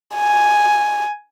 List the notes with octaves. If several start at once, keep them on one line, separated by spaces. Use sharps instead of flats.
G#5